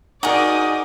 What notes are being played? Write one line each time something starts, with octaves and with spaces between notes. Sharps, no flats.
D#4 F#4 G#4 A#4 D5 D#6